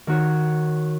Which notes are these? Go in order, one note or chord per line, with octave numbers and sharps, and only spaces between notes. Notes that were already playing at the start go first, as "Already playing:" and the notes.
D#3 F#4 C#5